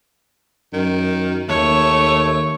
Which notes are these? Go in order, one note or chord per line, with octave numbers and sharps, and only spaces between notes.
F#2 D#3
D#2 A3 C#5